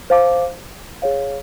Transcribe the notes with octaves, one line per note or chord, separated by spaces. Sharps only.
C5 F5 A5 D6
G#4 C#5 F5